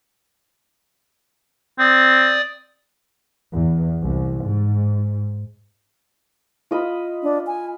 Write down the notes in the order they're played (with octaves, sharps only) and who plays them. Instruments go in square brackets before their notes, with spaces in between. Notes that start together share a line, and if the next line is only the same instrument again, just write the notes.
[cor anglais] C4 [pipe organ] D5 D#6
[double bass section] E2
C2
G#2
[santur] F4 D#5 B5
[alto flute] D4
G#5